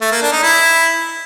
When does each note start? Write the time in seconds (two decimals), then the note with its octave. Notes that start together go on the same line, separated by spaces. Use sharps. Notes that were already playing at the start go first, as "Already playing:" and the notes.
0.01 A3
0.12 A#3
0.22 D4
0.32 D#4
0.43 E4